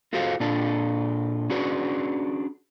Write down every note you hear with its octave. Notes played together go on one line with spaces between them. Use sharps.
F4 F#4 G#4 A4 C5 F5
A#2 D4 F4 A4
C#4 D4 F#4 G#4 B4